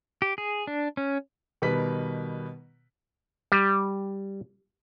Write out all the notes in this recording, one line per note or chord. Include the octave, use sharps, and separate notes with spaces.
G4
G#4
D4
C#4
B2 D#3 G3 B4 B6
G3